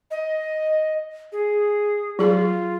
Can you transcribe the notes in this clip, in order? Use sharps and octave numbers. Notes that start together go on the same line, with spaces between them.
D#5
G#4
F#3 F4 G#4